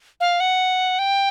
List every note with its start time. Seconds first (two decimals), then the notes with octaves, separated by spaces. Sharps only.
0.20 F5
0.40 F#5
0.99 G5